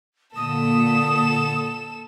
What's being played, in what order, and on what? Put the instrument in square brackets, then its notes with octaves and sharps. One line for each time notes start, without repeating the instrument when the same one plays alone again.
[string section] A#2 [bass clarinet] D3 [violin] A4 E7 [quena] D#6